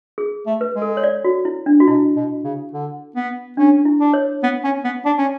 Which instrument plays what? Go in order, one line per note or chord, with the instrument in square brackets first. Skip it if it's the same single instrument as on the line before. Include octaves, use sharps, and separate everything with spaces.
[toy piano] G#4
[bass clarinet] A3
[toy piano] B4
[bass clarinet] G#3
[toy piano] A4
C#5
D5
F#4
E4
D4
F#4
[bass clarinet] B2 [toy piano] E4
[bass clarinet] B2
C#3
D3
B3
[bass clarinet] C#4 [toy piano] D4
[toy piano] E4
[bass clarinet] D4
[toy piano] C#5
[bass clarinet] B3
C#4
B3
D4
C#4